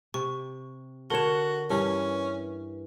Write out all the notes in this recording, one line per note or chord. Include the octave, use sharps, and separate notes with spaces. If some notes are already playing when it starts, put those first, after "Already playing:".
C3 C#6
D3 F#4 A#4 C#5 E7
G2 E3 C#4